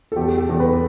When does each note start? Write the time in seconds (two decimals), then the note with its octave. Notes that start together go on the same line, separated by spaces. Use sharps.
0.12 A4
0.16 E2 G4
0.38 A4
0.49 E2
0.60 B4